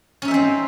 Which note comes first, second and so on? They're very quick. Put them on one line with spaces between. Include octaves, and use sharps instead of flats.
C#4 D#4 E5 C5 C4